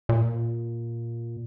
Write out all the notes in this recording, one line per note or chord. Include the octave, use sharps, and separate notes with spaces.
A#2